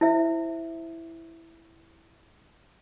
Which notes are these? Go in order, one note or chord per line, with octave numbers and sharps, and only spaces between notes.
E4 C5 E5